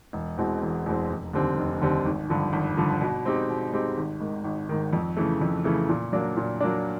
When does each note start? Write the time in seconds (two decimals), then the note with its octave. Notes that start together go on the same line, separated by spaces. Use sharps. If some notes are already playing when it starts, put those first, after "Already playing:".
0.13 E1
0.38 E2 B2 G#3 C4
0.62 E1
0.86 E2 B2 G#3 C4
1.10 F1
1.33 D#2 D3 G3 C4
1.57 F1
1.82 D#2 D3 G3 C4
2.06 G#1
2.29 G2 D3 F3
2.53 G#1
2.77 G2 D3 F3
3.01 B2
3.25 G#3 C4 D#4 G4
3.49 B2
3.73 G#3 C4 D#4 G4
3.97 G#1
4.20 G#2 D#3
4.44 G#1
4.69 G#2 D#3
4.93 F2
5.17 C#3 E3 A3
5.41 F2
5.64 C#3 E3 A3
5.89 A#2
6.13 F#3 A#3 D4
6.36 A#2
6.60 F#3 A#3 D4